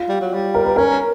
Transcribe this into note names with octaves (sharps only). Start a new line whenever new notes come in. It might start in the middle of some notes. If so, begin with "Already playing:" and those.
Already playing: F4
G3
F#3
G3
A#4
B4
C#4 A#4